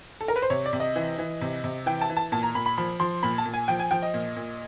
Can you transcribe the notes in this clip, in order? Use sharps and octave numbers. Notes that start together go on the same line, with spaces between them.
A4
A#4
B4
C5
C3 C#5
D5
C3
D#5
E3
E3
C3
C3
E3 G5
A5
E3
A5
A#2 A5
A#5
A#2 B5
B5
F3 B5
F3 C6
A#2 B5
A5
A#2
G#5
F3 G5
G#5
F3 G5
D#5
A#2
A#2